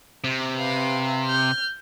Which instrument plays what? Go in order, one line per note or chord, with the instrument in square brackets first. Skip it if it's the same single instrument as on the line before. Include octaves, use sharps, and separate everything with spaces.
[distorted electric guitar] C3
[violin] B4 F5
F6 G6